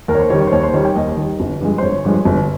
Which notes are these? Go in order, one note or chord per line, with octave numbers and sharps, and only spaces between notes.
D#2 A#4
C#5
C5
D#3 G3 C#5
C#5
C5
D#2 C#5
C5
D#3 G3 C#5
G5
D#2 D#5
D#3 G3
G1
G2 F3 G#3
C5
G1 C#5
G2 F3 G#3
G1